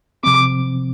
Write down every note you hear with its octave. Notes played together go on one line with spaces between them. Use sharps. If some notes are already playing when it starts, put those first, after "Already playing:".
C3 F3 C4 D6